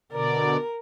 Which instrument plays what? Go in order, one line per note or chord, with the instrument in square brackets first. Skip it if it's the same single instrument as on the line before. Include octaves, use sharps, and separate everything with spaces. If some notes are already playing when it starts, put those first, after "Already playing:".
[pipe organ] B2 D3 D5 [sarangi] A#4